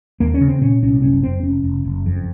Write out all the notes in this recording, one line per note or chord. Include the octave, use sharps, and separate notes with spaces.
D#2 A#3
C#4
C#3
C4
A#2 C#4
C2 C#4
F#1 C#4
F2 C4
F1 C#4
F1
F#1
F2